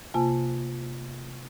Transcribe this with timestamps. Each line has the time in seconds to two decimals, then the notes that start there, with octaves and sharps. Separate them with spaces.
0.14 C3 A#3 F4 G#5 A5